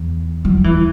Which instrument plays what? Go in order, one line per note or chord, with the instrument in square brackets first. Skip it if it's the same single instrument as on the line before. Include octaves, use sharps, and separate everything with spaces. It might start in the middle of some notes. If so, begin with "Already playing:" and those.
Already playing: [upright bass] E2
F#3
E3